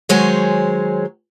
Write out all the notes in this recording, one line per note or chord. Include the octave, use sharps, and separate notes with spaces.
D#3 F#3 G#3 C5 C#5 G#5